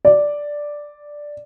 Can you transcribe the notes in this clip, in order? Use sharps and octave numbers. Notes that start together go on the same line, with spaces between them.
D5